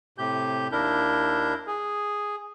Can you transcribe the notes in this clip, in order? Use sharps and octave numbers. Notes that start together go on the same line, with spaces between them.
A2 C3 G4 G6
D#2 D4 E4 A#4 G6
G#4